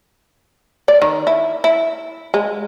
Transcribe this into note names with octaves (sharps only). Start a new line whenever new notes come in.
D5
D#3
E4
E4
G#3